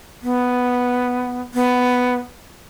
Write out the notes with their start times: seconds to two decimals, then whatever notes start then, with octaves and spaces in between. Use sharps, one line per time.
0.22 B3
1.54 B3